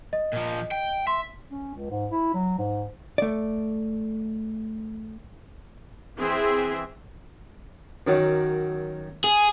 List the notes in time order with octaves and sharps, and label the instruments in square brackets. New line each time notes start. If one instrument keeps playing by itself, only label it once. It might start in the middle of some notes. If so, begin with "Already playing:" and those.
[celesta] D#5
[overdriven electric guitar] A#2 F3
G5
[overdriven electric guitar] E5 [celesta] C6
[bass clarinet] C#4
C#2
G#2
E4
F#3
G#2
[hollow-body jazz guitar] A3 D5
[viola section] E3 C4 G#4 E5
[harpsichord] F#2 D#3 F#3
[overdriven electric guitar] G#4